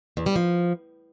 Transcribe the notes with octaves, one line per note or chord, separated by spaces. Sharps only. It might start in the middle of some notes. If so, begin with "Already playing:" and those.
E2
G3
F3